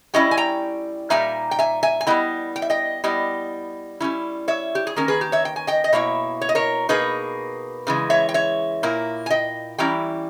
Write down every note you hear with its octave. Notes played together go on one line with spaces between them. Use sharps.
G3 C#4 E4 D#5 G5
G#5
G5 A#5
A#2 G3 A#3 D#4 E5 G#5
G5
E5 G#5
E5 G#5
G#5
G3 B3 E4 D#5 G5
G5
E5
D#5 G5
G3 B3 E4 D#5 G5
G3 C#4 E4
C#5 E5
G4
G#4
D#3 A#3 C#4 A#4
G#4 B4
G4
C#5 E5
G5
G#5
D#5 G5
D#5
B2 A#3 E4 C#5 E5
C#5
D#5
A#4 C#5
B2 A#3 D#4 G#4 B4
C#3 E3 G#3
C#5 E5
G5
C#5 E5
A#2 A#3 E4
G#5
D#5 G5
E3 G3 C#4 E4 G5 A#5